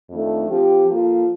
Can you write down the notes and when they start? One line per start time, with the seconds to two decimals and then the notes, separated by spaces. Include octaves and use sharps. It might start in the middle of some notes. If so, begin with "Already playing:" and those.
0.10 F2 D#3 A3 D4
0.49 F3 C4 G4
0.87 F3 A#3 F4 A4